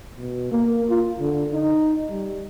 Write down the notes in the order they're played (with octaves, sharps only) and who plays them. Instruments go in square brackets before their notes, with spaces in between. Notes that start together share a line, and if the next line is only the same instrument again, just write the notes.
[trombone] B2
A#3
F4
D3
D#4
G3